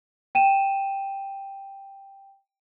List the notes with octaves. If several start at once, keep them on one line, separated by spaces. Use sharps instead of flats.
G5 D#7 E7